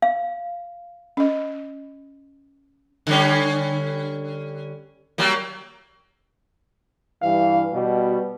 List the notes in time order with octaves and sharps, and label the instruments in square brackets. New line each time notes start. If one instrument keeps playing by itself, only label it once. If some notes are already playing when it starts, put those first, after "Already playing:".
[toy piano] F5
[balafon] C#4 D#5
[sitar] D3 G3 C#4
F#3 G3 A#3
[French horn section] G2 E3 [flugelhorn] F5
[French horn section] B2 [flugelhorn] G3